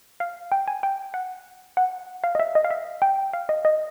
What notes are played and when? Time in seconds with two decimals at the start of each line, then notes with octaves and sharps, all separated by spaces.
0.20 F5
0.52 G5
0.68 G#5
0.83 G5
1.14 F#5
1.77 F#5
2.24 F5
2.35 D#5
2.40 E5
2.55 D#5
2.65 F5
2.71 E5
3.02 G5
3.33 F5
3.49 D#5
3.65 D#5